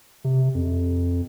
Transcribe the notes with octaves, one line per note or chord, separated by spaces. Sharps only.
C3
F2